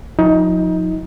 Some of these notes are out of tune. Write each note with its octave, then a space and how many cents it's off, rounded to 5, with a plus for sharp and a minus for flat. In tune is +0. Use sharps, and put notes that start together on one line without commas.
F3 +40 D#4 +25